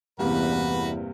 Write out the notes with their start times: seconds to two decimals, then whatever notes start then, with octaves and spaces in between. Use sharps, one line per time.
0.19 E2 G2 C3 A#3 F#4 B4